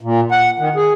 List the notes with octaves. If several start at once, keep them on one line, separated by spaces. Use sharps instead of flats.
A#2
F#5
D#3
G#4